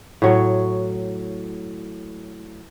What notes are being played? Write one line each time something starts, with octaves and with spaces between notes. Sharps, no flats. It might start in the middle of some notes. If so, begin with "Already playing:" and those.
A2 F#3 C#5